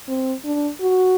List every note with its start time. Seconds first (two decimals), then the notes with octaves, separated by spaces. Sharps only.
0.08 C4
0.45 D4
0.81 F#4